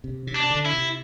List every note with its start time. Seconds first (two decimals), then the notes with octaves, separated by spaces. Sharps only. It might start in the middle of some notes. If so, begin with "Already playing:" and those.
0.04 C3
0.27 C3
0.35 D4
0.50 D3
0.66 E4
0.73 C3